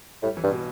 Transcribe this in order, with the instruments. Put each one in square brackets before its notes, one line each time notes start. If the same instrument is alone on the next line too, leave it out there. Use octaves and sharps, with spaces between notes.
[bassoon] A2 [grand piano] G3
[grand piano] E3
[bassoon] G2
[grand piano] B2